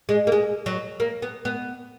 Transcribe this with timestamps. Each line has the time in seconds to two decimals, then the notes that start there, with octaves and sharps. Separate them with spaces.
0.09 G#3
0.27 A#3
0.32 G#3
0.66 F#3
1.00 A#3
1.22 B3
1.45 B3